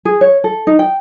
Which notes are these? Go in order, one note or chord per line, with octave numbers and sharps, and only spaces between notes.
G#4
C#5
A4
D#4
G5